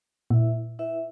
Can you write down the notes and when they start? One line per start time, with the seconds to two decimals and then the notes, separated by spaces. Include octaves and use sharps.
0.30 A#2 E4 B4 E5
0.79 E4 B4 E5